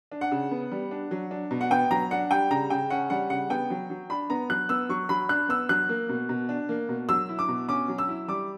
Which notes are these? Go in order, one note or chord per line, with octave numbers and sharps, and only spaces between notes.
D4
F#5
C#3
B3
G3
D4
F#3
D4
B2
F#5
B3 G5
F#3 A#5
D4 F#5
G3 G5
C#3 A#5
C#3 G5
C#4 F#5
G3 F#5
C#3 F#5
B3 G5
F#3
F#3
D4 B5
B3 A#5
F#3 F#6
B3 E6
F#3 C#6
F#3 B5
D4 F#6
B3 E6
F#3 F#6
A#3
B2
B2
D4
A#3
B2
F#3 E6
E4
D6
B2
C#4 D6
F#3
E6
E4
G3 D6